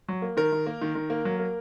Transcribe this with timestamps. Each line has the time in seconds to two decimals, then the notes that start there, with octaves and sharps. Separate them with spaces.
0.08 F#3
0.22 A#3
0.37 D#3 A#4
0.52 D#3
0.66 A#3
0.82 D#3
0.95 D#3
1.10 A#3
1.25 F#3
1.39 A#3